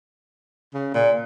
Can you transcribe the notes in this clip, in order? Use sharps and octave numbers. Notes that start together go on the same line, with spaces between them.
C#3
A#2